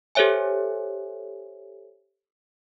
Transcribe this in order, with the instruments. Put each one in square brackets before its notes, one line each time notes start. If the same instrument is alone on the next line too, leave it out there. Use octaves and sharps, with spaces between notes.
[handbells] G4 A4 C5 C#5 E5 G#5